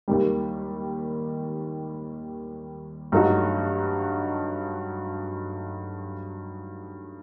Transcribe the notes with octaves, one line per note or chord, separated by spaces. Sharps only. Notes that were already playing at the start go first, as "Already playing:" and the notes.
D#2 D#3 G3
G2 F#3 A3 D#4 F#4